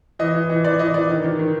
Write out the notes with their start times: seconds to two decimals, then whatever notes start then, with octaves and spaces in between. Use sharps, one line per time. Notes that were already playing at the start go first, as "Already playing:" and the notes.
0.19 E3 D#5
0.35 E3
0.49 E3
0.64 E3 D5
0.79 E3 D#5
0.94 E3 D5
1.09 D#3
1.24 D#3
1.39 D#3